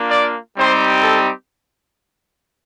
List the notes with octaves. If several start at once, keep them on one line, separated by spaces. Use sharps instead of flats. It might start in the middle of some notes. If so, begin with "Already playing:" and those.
Already playing: A#3 D4 F4
D5
G3 C4 D#4 G4 C5
A4